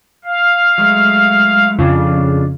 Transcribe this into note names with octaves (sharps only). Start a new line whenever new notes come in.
F5
F#3 G#3 A3
F2 C#3 D4 F4